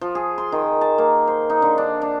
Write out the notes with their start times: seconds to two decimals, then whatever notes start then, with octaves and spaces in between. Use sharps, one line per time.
0.01 F3
0.15 G#4
0.38 C6
0.52 D#3
0.81 A5
0.98 A#3
1.27 C5
1.50 D#4
1.62 D3
1.78 D4
2.02 D4